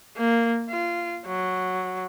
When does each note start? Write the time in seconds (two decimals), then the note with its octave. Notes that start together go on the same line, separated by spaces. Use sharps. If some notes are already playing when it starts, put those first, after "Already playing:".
0.17 A#3
0.69 F4
1.26 F#3